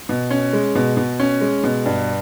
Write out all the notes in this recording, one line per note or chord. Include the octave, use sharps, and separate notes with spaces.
B2
C#4
G#3
B2
B2
C#4
G#3
B2
G2